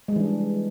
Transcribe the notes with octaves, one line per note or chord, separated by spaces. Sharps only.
E3 G3 G#3 D4